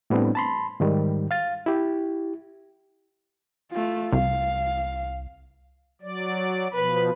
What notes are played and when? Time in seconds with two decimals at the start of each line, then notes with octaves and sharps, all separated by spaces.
0.10 A2 G3 B3 C4 D4
0.35 A5 B5 C6
0.80 G#2 D#3 G3
1.31 F5 A6
1.66 E4 G4
3.72 A3 F4
4.12 C2 F5
6.02 F#3 D5
6.74 B2 F3 B4